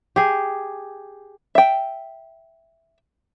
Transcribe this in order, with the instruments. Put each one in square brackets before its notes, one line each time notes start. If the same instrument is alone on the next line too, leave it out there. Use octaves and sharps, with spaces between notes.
[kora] G4 G#4
[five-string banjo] E5 G5